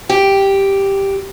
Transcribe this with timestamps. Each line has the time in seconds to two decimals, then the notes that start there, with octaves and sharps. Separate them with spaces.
0.09 G4